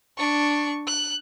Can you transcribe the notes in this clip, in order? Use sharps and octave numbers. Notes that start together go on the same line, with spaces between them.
D4 C#6
F#6